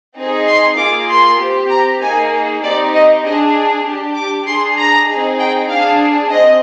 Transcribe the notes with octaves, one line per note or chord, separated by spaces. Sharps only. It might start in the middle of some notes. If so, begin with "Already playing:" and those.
C4 D#4 G#4
C6
A#3 F4 G#4 D6
C6
C4 G4
A#5
A#3 D#4 G#4 G#5
C4 D#4 G4 D5
D#5
D4 G#4 D#5
D4 G4
D6
D4 G#4 C6
A#5
C4 D#4 G#4
G5
D4 G#4 F5
C4 D#5